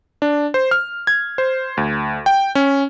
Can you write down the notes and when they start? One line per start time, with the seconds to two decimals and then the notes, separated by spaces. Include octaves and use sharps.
0.22 D4
0.54 C5
0.71 F6
1.07 G#6
1.38 C5
1.77 D2
2.26 G5
2.55 C#4